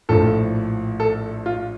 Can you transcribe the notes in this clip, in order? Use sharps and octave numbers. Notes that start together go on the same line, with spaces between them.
A#1 A2 F3 A4
A4
F4